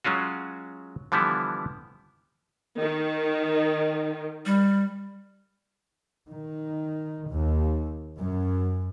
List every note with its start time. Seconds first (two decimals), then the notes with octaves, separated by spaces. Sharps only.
0.04 F#3 G#3 C#4 F4 F#4
1.12 D3 E3 F3 G3 B3 E4
2.79 D#3
4.46 G3
6.30 D#3
7.29 D#2
8.17 F#2